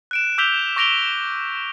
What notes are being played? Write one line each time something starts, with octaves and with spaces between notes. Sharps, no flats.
F#6 D7 E7
D6 E6 G6 B6 F7 G7
C#6 D6 A#6 D7 F7 G7